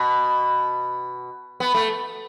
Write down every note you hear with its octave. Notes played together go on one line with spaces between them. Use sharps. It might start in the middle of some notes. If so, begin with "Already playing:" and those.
Already playing: B2
B3
A3